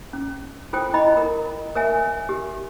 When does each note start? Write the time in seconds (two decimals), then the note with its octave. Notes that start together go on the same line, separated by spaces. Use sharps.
0.13 C#4
0.73 F4 A4 C5 G5
0.93 E4 D#5 B5
1.17 A#4
1.75 A#4 C#5 E5 G#5
2.29 G4